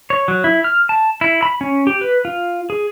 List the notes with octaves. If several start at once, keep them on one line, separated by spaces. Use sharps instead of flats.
C#5
F#3
E4
F6
A5
E4
B5
C#4
G4
B4
F4
G#4